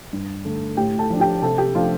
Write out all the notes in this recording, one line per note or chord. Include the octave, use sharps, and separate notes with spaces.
G2
D3 A3
A2 G4 G5
A4 A5
F3 D4
G4 G5
C3 A4 A5
G4 G5
F3 A3 D4 F4